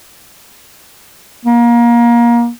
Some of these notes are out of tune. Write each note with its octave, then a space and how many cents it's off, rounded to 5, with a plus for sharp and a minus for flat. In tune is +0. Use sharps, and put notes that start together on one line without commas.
A#3 +25